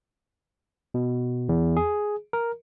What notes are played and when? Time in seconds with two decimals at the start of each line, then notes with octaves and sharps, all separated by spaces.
0.94 B2
1.49 E2
1.77 G#4
2.33 A#4